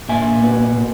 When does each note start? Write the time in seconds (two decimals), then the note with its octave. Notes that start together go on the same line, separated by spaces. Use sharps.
0.09 A#2 E5 G#5
0.42 B3
0.75 A#2